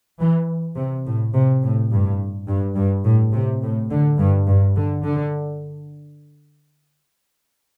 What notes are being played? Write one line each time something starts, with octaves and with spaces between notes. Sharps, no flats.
E3
C3
A2
C3
A2
G2
G2
G2
A2
C3
A2
D3
G2
G2
D3
D3